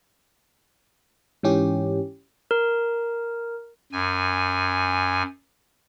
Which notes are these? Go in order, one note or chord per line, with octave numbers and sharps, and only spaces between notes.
G#2 E3 C#4 G4
A#4
F#2 G#5